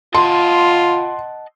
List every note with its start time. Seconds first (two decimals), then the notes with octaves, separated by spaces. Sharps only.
0.15 F4 D#5 F#5 A5 C6